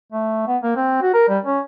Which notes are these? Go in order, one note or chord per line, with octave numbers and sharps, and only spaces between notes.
A3
B3
A#3
C4
F#4
A#4
G3
C#4